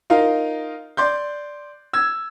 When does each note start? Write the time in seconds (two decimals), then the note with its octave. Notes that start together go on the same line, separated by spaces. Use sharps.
0.10 D#4 F4 A#4 F5
0.97 D5 C6 G6
1.93 E6 G#6